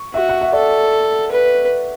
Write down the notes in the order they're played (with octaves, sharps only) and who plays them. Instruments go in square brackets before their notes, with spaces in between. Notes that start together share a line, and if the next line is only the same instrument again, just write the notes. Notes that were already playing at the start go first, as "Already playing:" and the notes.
Already playing: [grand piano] C#6
[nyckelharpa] F#4 [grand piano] E5
[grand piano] F#5
E5
[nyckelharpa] A4 [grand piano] D5
[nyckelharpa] B4